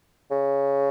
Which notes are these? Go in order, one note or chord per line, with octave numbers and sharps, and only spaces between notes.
C#3